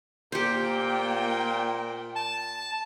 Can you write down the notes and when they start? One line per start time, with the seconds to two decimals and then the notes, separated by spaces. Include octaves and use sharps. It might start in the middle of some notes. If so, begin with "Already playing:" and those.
0.32 A#2 A#3 G4 C5 G5
2.16 A5